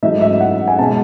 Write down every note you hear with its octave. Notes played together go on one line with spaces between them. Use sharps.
G#2 F#3 A3 D#4 E5
E5
F#5
G#5
B2 G#3 A5